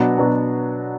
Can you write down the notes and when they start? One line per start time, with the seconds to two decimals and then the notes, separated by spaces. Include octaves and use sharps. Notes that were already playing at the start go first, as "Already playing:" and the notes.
Already playing: B2 F#3 B3 D4 F#4
0.18 B2 F#3 B3 D4 F#4